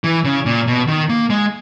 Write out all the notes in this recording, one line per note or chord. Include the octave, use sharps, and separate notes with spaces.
E3
C#3
A#2
B2
D#3
A#3
G#3